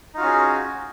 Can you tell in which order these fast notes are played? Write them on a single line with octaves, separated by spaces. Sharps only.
D#4 F4 F#4 C#4 G#4